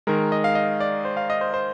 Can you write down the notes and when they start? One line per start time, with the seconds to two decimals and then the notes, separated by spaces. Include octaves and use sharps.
0.07 D#3 G#3 A#4
0.32 D#5
0.44 F5
0.55 D#5
0.80 D5
1.05 C5
1.17 F5
1.30 D#5
1.41 C5
1.54 C5